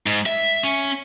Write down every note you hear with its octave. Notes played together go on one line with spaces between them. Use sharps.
G#2
E5
C#4